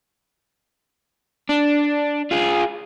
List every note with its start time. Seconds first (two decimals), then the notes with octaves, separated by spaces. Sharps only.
1.49 D4
2.31 F4 G#4